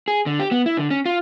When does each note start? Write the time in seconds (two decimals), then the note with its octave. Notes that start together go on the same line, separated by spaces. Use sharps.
0.08 G#4
0.26 D3
0.39 G4
0.51 B3
0.66 E4
0.77 D3
0.90 C#4
1.06 F4